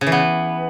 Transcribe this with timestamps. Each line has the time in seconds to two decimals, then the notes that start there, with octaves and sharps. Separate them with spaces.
0.01 C#3
0.07 E3
0.12 B3